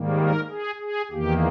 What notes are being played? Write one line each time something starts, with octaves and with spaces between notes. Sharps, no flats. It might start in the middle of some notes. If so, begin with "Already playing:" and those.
Already playing: G#2 D#3 G3 A#3
A#4
G#4
G#4
E2 D#3 A#3 G4